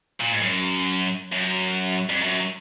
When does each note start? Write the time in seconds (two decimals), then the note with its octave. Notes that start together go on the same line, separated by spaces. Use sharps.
0.21 A#2
0.32 G#2
0.42 F#2
1.32 F#2
2.10 F2
2.22 F#2